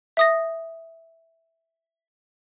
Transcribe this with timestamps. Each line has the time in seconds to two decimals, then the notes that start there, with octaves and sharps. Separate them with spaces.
0.17 E5 D#6 A#6